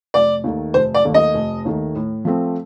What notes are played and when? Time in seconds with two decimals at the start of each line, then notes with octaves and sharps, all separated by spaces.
0.14 F1 D5
0.44 D#2 D#3 A3
0.74 F1 C5
0.94 D5
1.05 D#2 D#3 A3
1.14 D#5
1.34 F1
1.65 D#2 D#3 A3
1.95 A2
2.25 F3 A3 C4